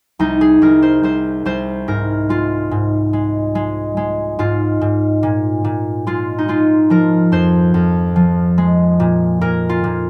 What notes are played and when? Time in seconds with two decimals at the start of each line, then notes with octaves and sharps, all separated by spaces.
0.19 C2 D#4
0.41 G#4
0.62 C2 A#4
0.82 C5
1.03 C2 C5
1.45 C2 C5
1.88 G#2 A#4
2.29 G#3 F4
2.71 G#2
3.13 G#3
3.55 G#3
3.97 G#3
4.39 G#2 F4
4.81 G#2
5.23 A#2
5.64 A#2
6.07 G#3 F4
6.38 D#4
6.48 G#3 F4
6.90 F3 A#4
7.32 F2 C5
7.74 F2
8.16 F3
8.58 G#3
9.00 A#2
9.41 A#2 A#4
9.69 F4
9.84 A#2